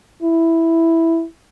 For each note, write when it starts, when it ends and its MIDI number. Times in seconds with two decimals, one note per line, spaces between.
0.23 1.24 64